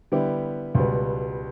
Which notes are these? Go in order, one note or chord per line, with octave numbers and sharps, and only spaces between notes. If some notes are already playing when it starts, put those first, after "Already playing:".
D3 G3 B3 E4 G4
C#2 B2 G3 B3